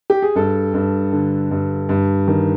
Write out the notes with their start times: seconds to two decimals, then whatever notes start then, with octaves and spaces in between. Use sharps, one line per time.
0.10 G4
0.22 G#4
0.36 G2 A4
0.74 G2
1.13 D3
1.51 G2
1.89 G2
2.28 D#3